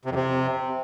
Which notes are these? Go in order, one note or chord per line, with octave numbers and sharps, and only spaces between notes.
C3
F2
C3